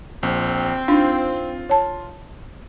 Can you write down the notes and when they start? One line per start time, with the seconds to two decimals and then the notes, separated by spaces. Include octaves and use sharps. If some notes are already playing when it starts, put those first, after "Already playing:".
0.23 A#1 C4
0.88 D4 D#4 F4
1.69 C#5 A5